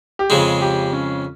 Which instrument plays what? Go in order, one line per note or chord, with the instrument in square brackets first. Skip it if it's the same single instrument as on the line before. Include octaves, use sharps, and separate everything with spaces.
[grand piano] G4
[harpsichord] F2 C#3 G#3 [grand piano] G#4
[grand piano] G4
C#4